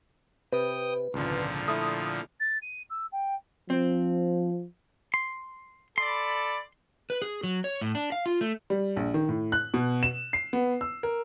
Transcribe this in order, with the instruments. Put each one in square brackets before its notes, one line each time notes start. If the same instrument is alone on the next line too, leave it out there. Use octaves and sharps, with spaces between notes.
[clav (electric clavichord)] C3 [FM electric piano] B4 [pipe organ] G5 D#6
[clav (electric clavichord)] G#1 C#2 [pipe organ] A#2 D3 F3
[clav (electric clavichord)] A3 E4 [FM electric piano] D#6
[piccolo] A6
D#7
E6
G5
[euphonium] F3 [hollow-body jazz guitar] C4
[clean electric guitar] C6
[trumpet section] A4 D5 B5 [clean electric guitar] C6
[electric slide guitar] B4
G#4
F#3
C#5
A2
D4
F5
F4
A3
[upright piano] G3
A#1
D#3
A2
F#6
B2
E7
C7
B3
E6
A#4